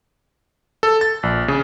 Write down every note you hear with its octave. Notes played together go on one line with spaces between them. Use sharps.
A4
A6
A#1
C#3